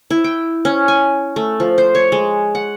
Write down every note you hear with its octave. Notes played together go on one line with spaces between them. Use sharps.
E4
G5
C#4
G#5
A3
F3
C5
C#5
G#3
F#5